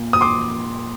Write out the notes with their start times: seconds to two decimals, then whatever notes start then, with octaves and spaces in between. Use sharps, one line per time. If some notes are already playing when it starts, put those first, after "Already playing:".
Already playing: A#2 A#3
0.13 D#6
0.21 C6 D6